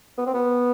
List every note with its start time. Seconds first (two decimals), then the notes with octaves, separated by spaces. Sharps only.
0.18 B3
0.26 C4
0.34 B3